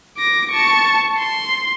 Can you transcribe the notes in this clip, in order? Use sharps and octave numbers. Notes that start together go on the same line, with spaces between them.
D6 A#6
A5 C#6
C6